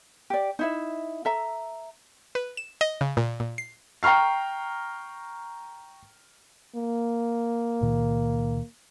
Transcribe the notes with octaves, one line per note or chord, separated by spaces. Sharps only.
G4 D5
D#4 E4 E5
A4 E5 A#5
B4
E7
D#5
C#3
A#2
A#2
C7
G5 A#5 C#6 F6 C7
A#3
C#2 A#2 D#3